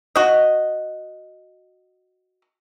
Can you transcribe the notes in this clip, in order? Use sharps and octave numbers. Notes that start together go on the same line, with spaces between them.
F#4 D#5